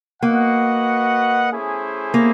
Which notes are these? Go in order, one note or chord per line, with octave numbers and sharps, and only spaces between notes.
A#3 F#4 B4 D#5 F#5
A3 C#4 E4 G#4 C5
A#3